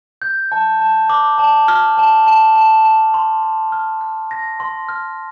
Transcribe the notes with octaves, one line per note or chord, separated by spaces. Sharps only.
G6
A5
A5
D6
A5
F6
A5
A5
A5
A5
C6
A5
F6
F6
A#6
C6
F6